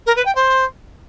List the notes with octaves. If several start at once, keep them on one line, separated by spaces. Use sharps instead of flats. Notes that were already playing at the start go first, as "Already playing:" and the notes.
A#4
B4
G5
C5